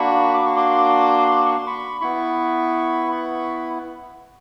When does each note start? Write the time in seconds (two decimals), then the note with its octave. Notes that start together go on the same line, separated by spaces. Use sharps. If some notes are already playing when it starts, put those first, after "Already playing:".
Already playing: A#3 D4 F#4 B5 C#6
0.34 D6
0.46 C#6
0.56 C6 D6
1.45 C#6
1.56 C6
1.67 B5 C#6
2.01 B3 E4 B5 C#6
3.11 B5 C#6